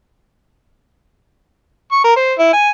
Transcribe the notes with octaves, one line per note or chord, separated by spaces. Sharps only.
C#6
A#4
C5
E4
G#5